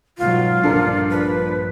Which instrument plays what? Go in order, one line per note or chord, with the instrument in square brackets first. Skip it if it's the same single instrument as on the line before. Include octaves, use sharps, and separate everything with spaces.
[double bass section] G#2 B2 F#3 [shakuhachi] F4
[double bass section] A#1 G2 F3 [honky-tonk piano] D4 A4 A#4
[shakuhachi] B4